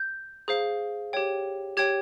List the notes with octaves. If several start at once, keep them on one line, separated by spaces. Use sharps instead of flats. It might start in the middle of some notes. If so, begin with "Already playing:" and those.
Already playing: G6
G#4 C5 F5
G4 C#5 G5
G4 C#5 G5 G#6